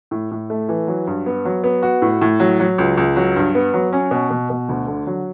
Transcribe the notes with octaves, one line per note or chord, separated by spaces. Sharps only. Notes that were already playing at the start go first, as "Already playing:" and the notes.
A2
A2
A3
E3
F#3
G2
B3
F#3
B3
F#4
A2
A2
F#3
F#3
C#2
C#2
F#3
G2
B3
F#3
C#4
B2
B2
B2
D2
D3
F#3